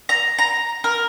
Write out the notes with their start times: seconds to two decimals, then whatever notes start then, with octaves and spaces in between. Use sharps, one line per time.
0.09 A#5
0.38 A#5
0.84 A#4